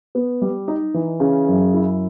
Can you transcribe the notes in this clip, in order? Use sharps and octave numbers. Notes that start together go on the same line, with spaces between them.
B3
G3
D#4
E3
C#3
F#2
E4